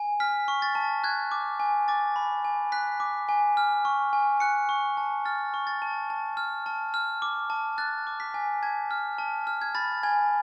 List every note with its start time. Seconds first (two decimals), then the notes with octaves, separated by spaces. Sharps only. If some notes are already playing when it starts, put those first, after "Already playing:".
Already playing: G#5
0.20 F6 B6
0.48 C#6
0.62 A6
0.75 A5
1.04 F#6 G#6
1.32 D6
1.60 G#5
1.88 D6 A6
2.16 B5
2.45 G#5
2.72 F#6 B6
3.00 D6
3.29 G#5
3.57 F6
3.85 C#6
4.13 G#5
4.40 F#6 C#7
4.69 C#6
4.97 A5
5.25 F6 A6
5.54 C#6
5.67 A6
5.82 A5
6.10 A5
6.37 F6
6.66 A5
6.94 F6
7.22 D6
7.50 A5
7.78 F#6 A6
8.07 D6
8.20 B6
8.34 G#5
8.63 A5 G#6
8.91 F6
9.18 A5
9.47 F6
9.62 G#6
9.75 B5 A6
10.03 G#5 G#6